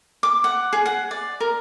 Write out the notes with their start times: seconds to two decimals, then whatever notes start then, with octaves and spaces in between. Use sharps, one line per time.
0.23 D6
0.44 F#5
0.73 G#4
0.86 F#5
1.11 D5
1.40 A#4